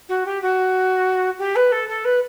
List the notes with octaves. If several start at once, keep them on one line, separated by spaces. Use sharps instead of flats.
F#4
G4
F#4
G4
B4
A4
A4
B4